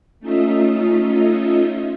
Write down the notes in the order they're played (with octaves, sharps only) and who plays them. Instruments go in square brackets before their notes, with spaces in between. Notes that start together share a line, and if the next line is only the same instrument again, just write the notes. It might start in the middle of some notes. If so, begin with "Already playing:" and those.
[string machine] A3 C#4 D#4 F4 D#5 E5